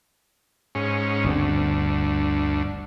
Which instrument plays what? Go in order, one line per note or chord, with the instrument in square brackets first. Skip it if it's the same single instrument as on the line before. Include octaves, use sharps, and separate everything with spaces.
[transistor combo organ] G#2 C#4
[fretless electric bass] G1 B2 C4 [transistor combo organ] D2